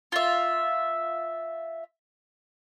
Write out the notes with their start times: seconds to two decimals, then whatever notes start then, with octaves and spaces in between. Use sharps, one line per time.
0.12 F4 E5